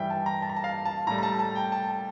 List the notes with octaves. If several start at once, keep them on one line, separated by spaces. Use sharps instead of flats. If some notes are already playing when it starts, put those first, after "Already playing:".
Already playing: G2 E3 G3 E5 G5
A5
A#5
A5
A#5
A5
F5
A5
A2 G3 A#5
A#5
A5
A5
G5
A5
A5